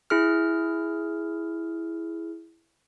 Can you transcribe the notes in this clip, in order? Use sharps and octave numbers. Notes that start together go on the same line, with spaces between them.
E4 G#4 F6